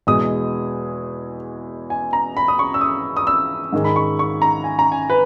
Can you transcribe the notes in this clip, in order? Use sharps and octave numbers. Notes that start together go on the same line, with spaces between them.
E2 B2 G#3 D#6
G#5
A#5
B5
D#6
C#6
E6
D#6
D#6
E6
G#2 D#3 G#3
B5
C#6
C#6
A#5
G#5
A#5
G#5
B4